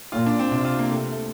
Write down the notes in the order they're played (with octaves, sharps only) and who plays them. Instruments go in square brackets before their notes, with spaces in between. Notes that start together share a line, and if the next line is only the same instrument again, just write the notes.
[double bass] A#2 [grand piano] F4
[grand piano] D4
C4
[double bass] C3 [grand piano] D4
[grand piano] F4
A#3
A3
A3